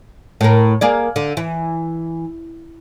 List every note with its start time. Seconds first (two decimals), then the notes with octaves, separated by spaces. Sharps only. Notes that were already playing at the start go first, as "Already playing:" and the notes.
0.41 A2 A#4
0.81 A#3 G#4 D5
1.16 D3
1.37 E3